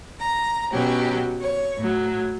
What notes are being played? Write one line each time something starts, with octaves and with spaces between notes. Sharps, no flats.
A#5
B2 F#3 C#4 G4
C#5
A2 F#3